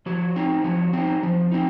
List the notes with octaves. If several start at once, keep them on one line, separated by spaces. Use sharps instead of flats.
F3 F#4
C4 D#4
F3 F#4
C4 D#4
F3
C4 D#4